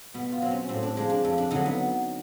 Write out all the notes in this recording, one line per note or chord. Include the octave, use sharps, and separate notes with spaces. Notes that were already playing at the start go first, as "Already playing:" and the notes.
B2 B3
F4
F#3 C4
C#4
A2 C4
D4
F3 G#3 D4
D4
F2
D4
D3 F#3 D#4
B3